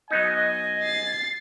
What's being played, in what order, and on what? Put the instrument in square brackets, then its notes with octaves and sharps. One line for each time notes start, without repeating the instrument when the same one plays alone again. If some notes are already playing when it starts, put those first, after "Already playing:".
[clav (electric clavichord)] F#3 B3 D#4 [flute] D#5 [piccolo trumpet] G#5
[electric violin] A6 C7